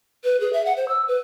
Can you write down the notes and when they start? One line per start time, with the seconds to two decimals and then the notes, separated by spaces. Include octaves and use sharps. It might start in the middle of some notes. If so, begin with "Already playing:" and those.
0.24 B4
0.40 G#4
0.53 E5
0.65 F#5
0.77 C5
0.89 E6
1.08 B4